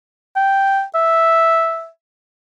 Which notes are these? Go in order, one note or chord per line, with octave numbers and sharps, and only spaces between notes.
G5
E5